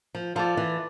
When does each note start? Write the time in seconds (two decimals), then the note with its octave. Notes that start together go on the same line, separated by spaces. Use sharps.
0.15 F3
0.35 F3 F4 A4 D5
0.57 E3